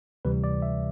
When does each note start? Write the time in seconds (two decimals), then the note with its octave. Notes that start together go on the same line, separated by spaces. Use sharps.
0.25 D2 C3 E3 G3 B4
0.44 D5
0.62 E5